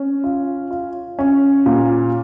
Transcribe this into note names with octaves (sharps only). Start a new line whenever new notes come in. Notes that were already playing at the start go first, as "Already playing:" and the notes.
Already playing: C#4
F4
F4
C#4
A#2